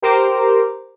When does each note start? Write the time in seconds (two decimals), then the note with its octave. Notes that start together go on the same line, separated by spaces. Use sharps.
0.02 G4 A#4 C5 A#5 D6